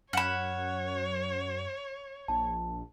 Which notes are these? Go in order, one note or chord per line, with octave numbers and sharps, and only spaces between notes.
F#2 C#5 F#5 B5 F6 E7
A#1 A5